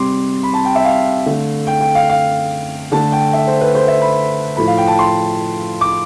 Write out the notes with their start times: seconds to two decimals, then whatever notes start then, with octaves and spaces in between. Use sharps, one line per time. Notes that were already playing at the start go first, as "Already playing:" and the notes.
Already playing: C3 G3 C6 D6
0.43 B5
0.53 A5
0.65 G5
0.75 E5
0.84 F5
1.26 D3 A3
1.67 G5
1.81 G5
1.95 F5
2.09 F5
2.92 D3 A3 A5
3.12 G5
3.33 E5
3.47 C5
3.61 B4
3.75 C5
3.87 E5
4.02 B5
4.57 A2 F3 A3 B5
4.67 F5
4.78 G5
4.87 A5
4.99 C6
5.81 D6